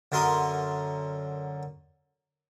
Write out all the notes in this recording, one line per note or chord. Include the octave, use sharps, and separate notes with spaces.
F#2 D3 A#4 C6 D#6